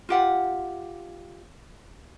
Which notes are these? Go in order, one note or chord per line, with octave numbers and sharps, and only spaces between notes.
F4 G4 F#5